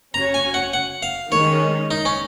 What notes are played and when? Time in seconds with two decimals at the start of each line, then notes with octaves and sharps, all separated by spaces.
0.14 C#4 F#4 C#5 A#5
0.34 G#5
0.54 F#5
0.73 F#5
1.03 F5
1.32 D#3 G#3 C#4 C#5
1.91 D#4
2.05 C#4